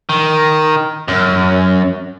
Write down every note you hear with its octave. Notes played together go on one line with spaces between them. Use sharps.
D#3
F#2